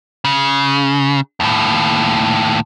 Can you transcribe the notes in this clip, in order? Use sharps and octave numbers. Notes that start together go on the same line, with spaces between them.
C#3
D#2 A2